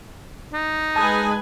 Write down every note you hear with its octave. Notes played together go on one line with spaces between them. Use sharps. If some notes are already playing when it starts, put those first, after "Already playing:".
D#4
G#3 B4 G#5 A5 D#6